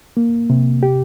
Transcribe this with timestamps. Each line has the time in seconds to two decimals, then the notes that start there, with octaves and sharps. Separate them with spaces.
0.17 A#3
0.50 C3
0.83 G4